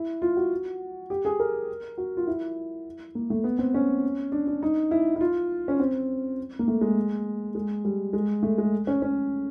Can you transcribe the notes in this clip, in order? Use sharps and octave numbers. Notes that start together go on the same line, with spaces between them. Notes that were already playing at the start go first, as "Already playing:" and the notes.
Already playing: E4
F4
F#4
G4
G#4
A#4
F#4
F4
E4
A#3
A3
B3
C4
C#4
D4
D4
D#4
E4
E4
F4
C#4
C4
A#3
A3
G#3
G#3
G3
G#3
A3
G#3
C#4
C#4